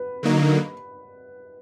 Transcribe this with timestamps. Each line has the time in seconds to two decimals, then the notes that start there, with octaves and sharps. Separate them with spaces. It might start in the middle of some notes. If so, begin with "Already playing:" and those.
Already playing: B4
0.23 D3 F#3 A#3 D#4